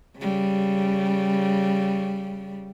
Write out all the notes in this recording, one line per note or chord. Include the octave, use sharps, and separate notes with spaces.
C#3 G3